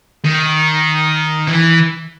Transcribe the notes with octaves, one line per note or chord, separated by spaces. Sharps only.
D#3
E3